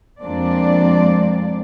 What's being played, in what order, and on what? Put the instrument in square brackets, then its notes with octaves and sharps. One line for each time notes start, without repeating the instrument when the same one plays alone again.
[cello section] F2 G#3 A#3 C4 D4 D5